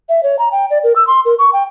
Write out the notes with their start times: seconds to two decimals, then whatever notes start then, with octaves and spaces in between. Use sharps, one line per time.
0.09 E5
0.23 C#5
0.39 A#5
0.52 G5
0.70 D5
0.84 A#4
0.96 E6
1.07 C6
1.25 A#4
1.39 C#6
1.53 G5